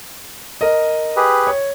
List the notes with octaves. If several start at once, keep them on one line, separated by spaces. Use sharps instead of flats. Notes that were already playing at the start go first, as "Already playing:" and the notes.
A#4 D#5
G4 G#4 B4
C#5